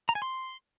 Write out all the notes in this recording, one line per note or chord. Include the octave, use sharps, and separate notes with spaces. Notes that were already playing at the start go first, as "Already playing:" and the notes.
A#5
G#5
C6